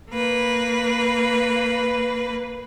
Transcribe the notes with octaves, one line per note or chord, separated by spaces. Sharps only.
A#3 B4